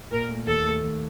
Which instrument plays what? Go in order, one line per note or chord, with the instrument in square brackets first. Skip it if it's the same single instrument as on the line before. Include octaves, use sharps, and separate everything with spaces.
[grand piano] A#2 [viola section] A#4
[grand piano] A3
[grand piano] D#2 [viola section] A4
[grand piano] A3
D#2